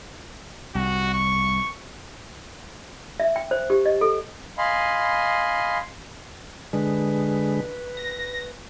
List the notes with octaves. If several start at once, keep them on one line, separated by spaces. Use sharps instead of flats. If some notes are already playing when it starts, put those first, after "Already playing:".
C2 F#4
C#6
E5
G5
C5
G4
D#5
A4
D#5 F5 G#5 B5 C6
D3 G#3 B4
A#6